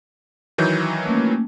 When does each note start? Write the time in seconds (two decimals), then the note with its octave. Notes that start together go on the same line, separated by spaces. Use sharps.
0.58 D#3 E3 F#3 G6
1.06 A3 A#3 C#4